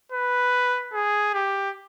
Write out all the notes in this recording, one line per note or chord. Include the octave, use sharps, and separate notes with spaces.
B4
G#4
G4